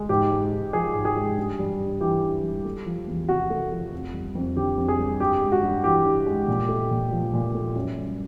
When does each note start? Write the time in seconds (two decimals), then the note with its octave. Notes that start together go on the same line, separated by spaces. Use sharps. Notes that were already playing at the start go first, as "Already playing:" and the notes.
Already playing: G#3
0.09 G#2 G4
0.31 G#3
0.52 G#2
0.73 F3 G#4
0.95 G#2
1.05 G#4
1.16 G#3
1.38 G2
1.59 G3
1.80 G2
2.00 E3 G4
2.22 G2
2.43 G3
2.65 A3
2.86 F3
3.08 E2
3.29 C3 F#4
3.50 A3
3.72 F3
3.93 F2
4.13 G3
4.35 F2
4.56 D3 G4
4.78 F2
4.88 G#4
4.99 G3
5.20 G2 G4
5.41 G#3
5.52 F#4
5.63 G2
5.84 E3 G4
6.05 G2
6.26 G#3
6.48 A#2
6.69 A3
6.91 A#2
7.12 F3
7.33 A#2
7.54 A3
7.75 F#2
7.97 G3